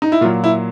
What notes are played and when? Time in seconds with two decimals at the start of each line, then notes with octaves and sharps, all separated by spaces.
0.02 D#4
0.12 E4
0.21 A#2 F4
0.25 F#3
0.44 E4